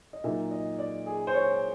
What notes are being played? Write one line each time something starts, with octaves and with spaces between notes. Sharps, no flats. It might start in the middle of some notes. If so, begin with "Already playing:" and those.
D#5
A#2 F#3 A#3 D#4 E5
D#5
D5
G#4
C5
C#5